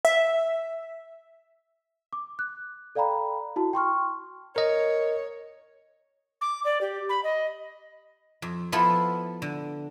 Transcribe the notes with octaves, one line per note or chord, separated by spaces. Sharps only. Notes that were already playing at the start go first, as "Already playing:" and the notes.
E5
D6
F#6
A4 D5 F5 G5 A#5 B5
E4 F#4 A5
G5 C6 C#6 F6
A#4 C#5 D#5
D6
D5
G4
B5
D#5
F2
F3 B3 E4 F4 A4 B4
D3